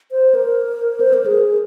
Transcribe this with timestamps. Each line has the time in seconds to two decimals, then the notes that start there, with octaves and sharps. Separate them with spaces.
0.11 C5
0.35 A#4
1.00 C5
1.14 A#4
1.26 G#4